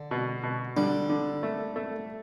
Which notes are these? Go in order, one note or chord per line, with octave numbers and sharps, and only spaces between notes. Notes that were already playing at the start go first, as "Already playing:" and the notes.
Already playing: D3
B2
B2
D3 G3
D3
A3
A3